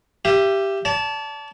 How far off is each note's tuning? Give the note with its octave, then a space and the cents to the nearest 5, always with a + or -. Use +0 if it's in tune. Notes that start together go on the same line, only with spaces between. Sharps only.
G4 +0 E5 +35 D#6 +0
D5 -40 A5 +0